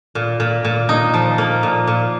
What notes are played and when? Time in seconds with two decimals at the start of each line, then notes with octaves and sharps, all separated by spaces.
0.15 A#2
0.40 A#2
0.64 A#2
0.89 D#4
1.14 F3
1.38 A#3
1.63 A#2
1.87 A#2